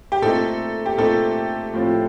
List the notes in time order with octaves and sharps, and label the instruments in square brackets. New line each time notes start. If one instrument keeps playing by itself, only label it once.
[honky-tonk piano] G4
[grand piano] A#2 A3 C4 D#4 [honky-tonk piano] A4
[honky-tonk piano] G4
[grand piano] A#2 A3 C4 D#4 [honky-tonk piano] A4
[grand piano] A2 F3 A3 C4 F4